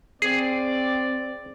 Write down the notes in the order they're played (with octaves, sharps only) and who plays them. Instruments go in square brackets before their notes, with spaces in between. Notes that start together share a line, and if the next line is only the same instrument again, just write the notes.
[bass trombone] C4 [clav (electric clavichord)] G#4 [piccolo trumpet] D5